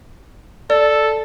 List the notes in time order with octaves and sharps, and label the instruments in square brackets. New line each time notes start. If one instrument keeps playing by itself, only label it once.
[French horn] A4 [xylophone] D5